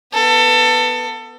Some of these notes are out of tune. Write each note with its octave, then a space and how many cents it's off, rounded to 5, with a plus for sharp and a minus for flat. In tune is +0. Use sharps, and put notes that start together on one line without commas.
B3 +0 A4 +25